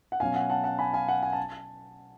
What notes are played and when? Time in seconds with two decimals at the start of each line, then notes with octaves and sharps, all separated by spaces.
0.12 F#5
0.20 B2 F#3 C#4 F5 G#5
0.35 F#5
0.50 F#5 A5
0.64 F#5 A5
0.79 G#5 B5
0.93 F5 G#5
1.08 F#5
1.23 G#5
1.33 A5